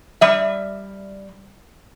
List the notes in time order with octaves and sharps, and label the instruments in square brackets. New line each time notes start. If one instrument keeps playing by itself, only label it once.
[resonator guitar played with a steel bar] G3 E5